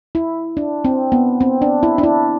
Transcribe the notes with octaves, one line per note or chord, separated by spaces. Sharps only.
E4
D4
C4
B3
C4
D4
E4
D4
E4